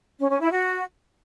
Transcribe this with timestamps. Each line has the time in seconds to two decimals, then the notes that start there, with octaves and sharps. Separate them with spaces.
0.18 C#4
0.28 C#4
0.39 E4
0.49 F#4